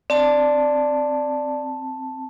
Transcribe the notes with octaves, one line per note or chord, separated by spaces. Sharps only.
C4 D5 A5